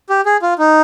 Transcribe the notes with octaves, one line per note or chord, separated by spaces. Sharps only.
G4
G#4
F4
D#4